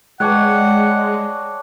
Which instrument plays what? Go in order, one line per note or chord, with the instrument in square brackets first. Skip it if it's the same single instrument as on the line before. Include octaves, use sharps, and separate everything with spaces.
[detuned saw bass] G#3 [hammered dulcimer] C#5 D5 G5 [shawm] F#5 [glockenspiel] A5 D6 F#6